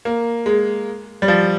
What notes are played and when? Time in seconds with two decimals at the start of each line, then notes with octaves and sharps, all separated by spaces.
0.05 A#3
0.46 G#3
1.22 G3
1.28 F3